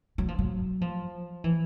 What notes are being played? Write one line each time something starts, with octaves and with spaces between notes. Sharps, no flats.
F#3
F3
F#3
F3
E3